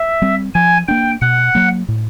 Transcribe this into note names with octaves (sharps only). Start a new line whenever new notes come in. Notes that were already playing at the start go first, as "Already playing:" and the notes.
Already playing: E5
G3 C4
F3 G#5
A#3 D4 G5
B2 F#5
F#3 A#3
A2